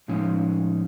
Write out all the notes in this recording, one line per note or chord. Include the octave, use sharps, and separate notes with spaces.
A2 F3 G#3 C#4 D#4